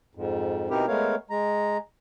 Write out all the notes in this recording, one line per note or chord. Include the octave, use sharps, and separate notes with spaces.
F2 G#2
B2 C4 D#4 E4 G4 A#4
G#3 A3 B3 A#4 C#5 F5
G#3 A#5